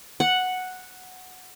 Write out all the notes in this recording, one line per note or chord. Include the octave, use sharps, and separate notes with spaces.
F#5